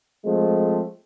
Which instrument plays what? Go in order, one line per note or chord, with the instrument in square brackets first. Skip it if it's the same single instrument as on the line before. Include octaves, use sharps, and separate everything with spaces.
[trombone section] F3 G#3 A3 C4